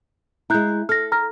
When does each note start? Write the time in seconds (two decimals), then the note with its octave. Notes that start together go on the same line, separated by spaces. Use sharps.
0.50 G#3 E4 A#5 F#6 G6
0.89 A4 F6 A#6
1.12 A#5 F6 A#6